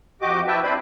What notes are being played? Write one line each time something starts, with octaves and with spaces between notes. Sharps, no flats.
F2 F#4 G4 D#5 D6
E4 B4 E5 G5 A5
C4 D4 E4 B4 C5 B5